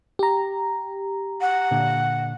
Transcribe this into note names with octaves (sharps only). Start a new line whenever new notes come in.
G4 A#5
F#5
A#2 D3